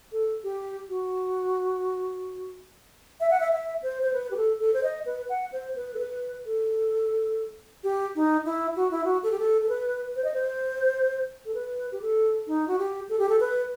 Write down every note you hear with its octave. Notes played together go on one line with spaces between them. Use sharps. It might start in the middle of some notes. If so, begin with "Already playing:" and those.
A4
G4
F#4
E5
F#5
E5
E5
C5
C5
B4
G4
A4
A4
C5
D#5
B4
F#5
C5
B4
A4
B4
A4
G4
D#4
E4
F#4
E4
F#4
A4
G4
A4
A4
B4
C5
D#5
C5
A4
B4
G4
A4
D#4
F#4
G4
A4
G4
A4
B4